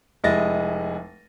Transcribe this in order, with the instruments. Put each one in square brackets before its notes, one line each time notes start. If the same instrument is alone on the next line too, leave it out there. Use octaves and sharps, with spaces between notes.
[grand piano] F1 G#3 E4 D#5 A6 A#6